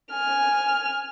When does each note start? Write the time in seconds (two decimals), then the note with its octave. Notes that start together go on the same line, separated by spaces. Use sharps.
0.12 G#5 F6